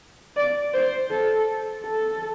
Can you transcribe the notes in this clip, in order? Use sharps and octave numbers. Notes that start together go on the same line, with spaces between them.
D5
C5
A4
A4